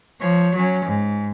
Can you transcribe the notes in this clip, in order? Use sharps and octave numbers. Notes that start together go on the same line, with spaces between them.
F3 C#5
F#3 C#4
G#2